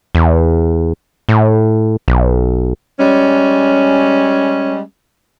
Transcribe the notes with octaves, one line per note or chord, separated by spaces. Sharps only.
E2
A2
B1
G3 G#3 C#4